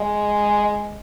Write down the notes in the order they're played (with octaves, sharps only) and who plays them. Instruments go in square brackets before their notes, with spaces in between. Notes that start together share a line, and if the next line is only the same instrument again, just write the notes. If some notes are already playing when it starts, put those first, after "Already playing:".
Already playing: [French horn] G#3